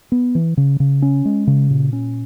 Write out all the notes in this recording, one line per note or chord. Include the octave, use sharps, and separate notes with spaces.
B3
E3
C#3
C#3
C#4
G#3
C#3
A#2
C#4